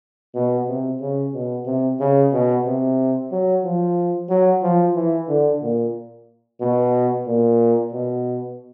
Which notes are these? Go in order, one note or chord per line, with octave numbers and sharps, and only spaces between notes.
B2
C3
C#3
B2
C3
C#3
B2
C3
F#3
F3
F#3
F3
E3
D3
A#2
B2
A#2
B2